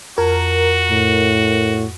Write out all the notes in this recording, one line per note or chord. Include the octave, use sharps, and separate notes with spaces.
F2 F#4 A#4
A2